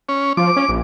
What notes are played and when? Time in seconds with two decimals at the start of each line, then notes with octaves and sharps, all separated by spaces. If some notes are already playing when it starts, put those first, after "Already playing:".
0.09 C#4
0.37 F3 D6
0.56 C#4
0.69 A#1